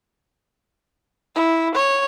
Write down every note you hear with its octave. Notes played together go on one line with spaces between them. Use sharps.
E4
C#5